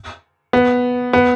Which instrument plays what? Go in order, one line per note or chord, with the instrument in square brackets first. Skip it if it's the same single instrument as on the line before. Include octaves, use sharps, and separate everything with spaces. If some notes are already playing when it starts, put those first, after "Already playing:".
[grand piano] B3
B3